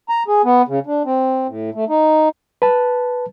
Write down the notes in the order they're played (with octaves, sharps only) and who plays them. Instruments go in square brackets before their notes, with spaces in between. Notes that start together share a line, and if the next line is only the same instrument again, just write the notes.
[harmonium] A#5
G#4
B3
C#3
D4
C4
A2
A3
D#4
[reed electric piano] B4 A5